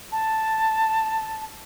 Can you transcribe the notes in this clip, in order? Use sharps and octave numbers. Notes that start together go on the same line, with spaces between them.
A5